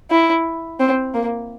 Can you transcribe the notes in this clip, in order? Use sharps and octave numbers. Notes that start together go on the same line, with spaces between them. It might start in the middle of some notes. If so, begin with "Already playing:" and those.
E4
C4
A#3